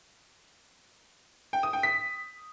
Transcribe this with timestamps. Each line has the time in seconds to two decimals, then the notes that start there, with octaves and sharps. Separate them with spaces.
1.53 G5
1.63 D#6
1.73 G5
1.83 B6